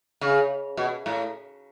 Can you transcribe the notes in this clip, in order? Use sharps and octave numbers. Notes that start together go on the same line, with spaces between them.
C#3
B2
A2